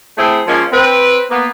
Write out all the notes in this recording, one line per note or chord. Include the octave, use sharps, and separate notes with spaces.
A3 C4 E4 G#4
F3 G#3 A#3 C#4
C4 B4
A#3 B3